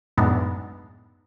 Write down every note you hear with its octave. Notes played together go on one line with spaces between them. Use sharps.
F#2 A2 G#3 B3 D4 D#4